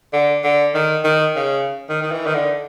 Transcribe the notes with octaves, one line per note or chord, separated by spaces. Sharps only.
D3
D3
D#3
D#3
C#3
D#3
D#3
E3
D#3
D3